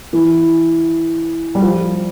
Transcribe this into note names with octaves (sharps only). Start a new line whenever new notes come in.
E3
G3
F3